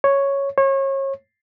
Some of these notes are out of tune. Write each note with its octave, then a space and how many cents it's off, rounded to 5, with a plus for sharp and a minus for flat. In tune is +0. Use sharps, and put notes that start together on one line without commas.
C#5 +0
C#5 -30